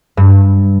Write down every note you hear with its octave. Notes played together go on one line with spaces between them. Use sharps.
G2